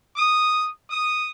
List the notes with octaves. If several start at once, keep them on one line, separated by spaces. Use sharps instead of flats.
D#6
D#6